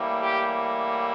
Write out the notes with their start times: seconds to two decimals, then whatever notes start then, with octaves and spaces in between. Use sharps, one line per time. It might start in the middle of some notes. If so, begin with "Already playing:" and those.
Already playing: A2 E3 G3 A#3
0.21 G4